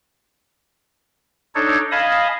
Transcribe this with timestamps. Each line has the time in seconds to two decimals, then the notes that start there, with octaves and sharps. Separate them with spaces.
1.55 D4 D#4 A4 C#5
1.91 D#5 F5 G#5 A5 B5 D#6